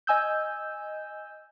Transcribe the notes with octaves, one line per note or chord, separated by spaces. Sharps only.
D#5 G#5 E6 G6